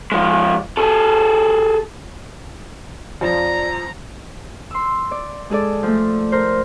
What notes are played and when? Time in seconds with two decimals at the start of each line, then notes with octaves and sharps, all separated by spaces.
0.12 F3 G#3
0.77 G#4 A4
3.21 F2 F3 D5 A#5
4.71 C6 E6
5.11 D5
5.50 G#3 G#4 A4 D5
5.83 F3 A3
6.32 A#4 C5